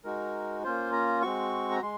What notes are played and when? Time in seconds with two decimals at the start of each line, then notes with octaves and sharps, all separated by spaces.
0.04 G#3 D#4 F#4 A#4
0.64 A#3 C#4 F4 C5
0.93 A#5
1.22 G#3 C4 F#4 C#6
1.71 A#5
1.82 G#3 C6